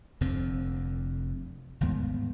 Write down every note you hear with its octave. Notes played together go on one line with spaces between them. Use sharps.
F1 F2 D3 C4
G1 D#2 G#2 B3